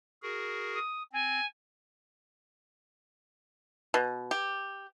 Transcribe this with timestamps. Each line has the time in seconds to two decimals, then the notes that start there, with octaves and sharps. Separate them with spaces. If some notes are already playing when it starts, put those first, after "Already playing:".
0.23 F#4 G#4 A#4
0.74 D#6
1.12 C4 G#5
3.94 B2
4.31 G4